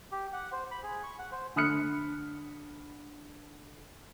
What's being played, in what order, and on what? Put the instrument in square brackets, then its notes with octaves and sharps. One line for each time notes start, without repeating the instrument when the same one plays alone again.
[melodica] G4
F#5
C5
B5
G#4
C#6
F#5
C5
[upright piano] D3 B5 D#6 F6 F#6 C#7